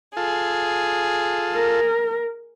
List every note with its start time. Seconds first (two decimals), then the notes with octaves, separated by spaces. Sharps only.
0.17 F4 G#4 A4
1.54 A#4